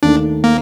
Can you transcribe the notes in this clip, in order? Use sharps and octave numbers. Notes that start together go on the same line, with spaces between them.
D#2 D#3 A3 D4
A#3